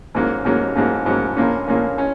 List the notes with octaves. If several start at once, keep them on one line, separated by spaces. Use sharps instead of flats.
G#2 F#3 A#3 C#4
G#2 F#3 A#3 C#4
G#2 F#3 A#3 C#4
G#2 F#3 A#3 C#4
A#1 A#2 A#3 C#4
A#1 A#2 A#3 C#4
C#4